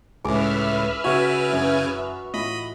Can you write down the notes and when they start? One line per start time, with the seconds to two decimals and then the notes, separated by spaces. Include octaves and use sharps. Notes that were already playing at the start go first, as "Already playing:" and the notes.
0.25 C#2 A2 G#3 C#4 B4 E5 D6 F6
1.04 C#3 F#4 G#5
1.49 F#2 E3
2.34 A2 E3 F4 D#5 B5